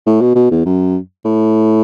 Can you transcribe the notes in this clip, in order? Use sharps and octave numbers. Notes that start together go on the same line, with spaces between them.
A2
B2
B2
E2
F#2
A2